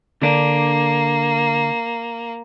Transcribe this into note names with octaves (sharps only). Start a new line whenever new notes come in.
D3 A#3 D4